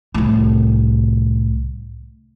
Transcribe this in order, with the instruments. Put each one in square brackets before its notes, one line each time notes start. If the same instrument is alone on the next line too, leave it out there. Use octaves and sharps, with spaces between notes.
[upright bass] C2 A2